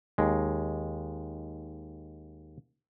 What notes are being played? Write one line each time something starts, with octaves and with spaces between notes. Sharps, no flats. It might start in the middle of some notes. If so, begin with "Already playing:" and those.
D#2 G#3